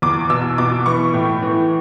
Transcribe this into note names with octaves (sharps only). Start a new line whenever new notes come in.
E2 D6
B2 E6
B2 D6
E3 C#6
A2
E3